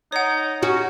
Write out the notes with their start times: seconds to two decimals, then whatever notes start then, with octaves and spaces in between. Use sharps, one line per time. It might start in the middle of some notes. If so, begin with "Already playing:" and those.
0.12 D#4 C#5 F#5
0.63 C#4 F#4